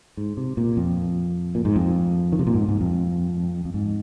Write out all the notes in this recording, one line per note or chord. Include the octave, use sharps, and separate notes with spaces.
G#2
C3
A#2
F2
A#2
G#2
F2
D#3
C3
A#2
G#2
G#2
F2
F2
G#2